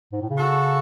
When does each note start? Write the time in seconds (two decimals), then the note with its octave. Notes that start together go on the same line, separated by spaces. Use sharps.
0.12 G#2
0.21 A2
0.30 C#3
0.38 F#4 A4